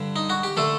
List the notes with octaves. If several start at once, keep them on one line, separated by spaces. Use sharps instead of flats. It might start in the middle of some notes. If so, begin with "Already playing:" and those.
Already playing: G2 D3
D#4
F#4
G4
D3 A3 A4